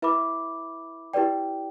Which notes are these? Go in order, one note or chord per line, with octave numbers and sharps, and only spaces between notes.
E4 B4 E5 B5 D6
E4 G4 B4 D5 G5